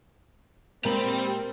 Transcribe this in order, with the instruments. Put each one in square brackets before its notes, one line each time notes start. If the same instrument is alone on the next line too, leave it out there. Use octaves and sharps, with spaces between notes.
[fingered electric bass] A#2 G#3 A#3 [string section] C4 [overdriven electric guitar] G4 B5 [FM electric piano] A#4